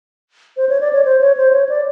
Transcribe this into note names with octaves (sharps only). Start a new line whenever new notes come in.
C5
C#5
D5
C#5
C5
C#5
C5
C#5
D5